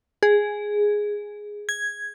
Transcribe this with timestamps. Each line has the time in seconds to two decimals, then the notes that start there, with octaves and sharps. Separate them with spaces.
0.23 G#4
1.69 G#6